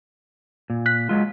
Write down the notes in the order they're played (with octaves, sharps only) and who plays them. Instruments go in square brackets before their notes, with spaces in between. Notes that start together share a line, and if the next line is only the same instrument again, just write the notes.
[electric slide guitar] A#2
[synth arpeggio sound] F#6 B6
[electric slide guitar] F#3 G#3 F4